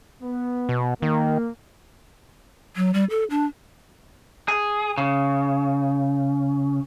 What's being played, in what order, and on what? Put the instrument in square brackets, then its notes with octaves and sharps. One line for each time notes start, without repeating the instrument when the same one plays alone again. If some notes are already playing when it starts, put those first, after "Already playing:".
[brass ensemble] B3
[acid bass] B2
[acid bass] D#3 [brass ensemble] A#3
[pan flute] F#3
G3
A4
D4
[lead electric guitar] G#4
C#3